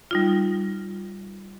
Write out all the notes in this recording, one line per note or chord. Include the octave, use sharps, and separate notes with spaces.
G3 D#4 F4